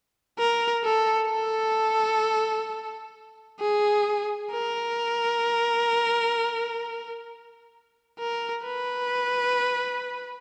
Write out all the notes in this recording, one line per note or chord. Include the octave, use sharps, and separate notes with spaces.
A#4
A4
A4
G#4
A#4
A#4
B4